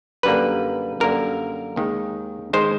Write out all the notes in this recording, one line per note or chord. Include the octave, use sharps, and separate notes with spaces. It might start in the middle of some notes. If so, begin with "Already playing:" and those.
F#2 D3 G3 A#3 B4
F#2 D3 G3 A#3 A#4
D#2 D#3 G#3
D#3 G#3 C5